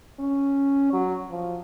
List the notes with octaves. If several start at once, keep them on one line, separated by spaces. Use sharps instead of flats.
C#4
F#3
F3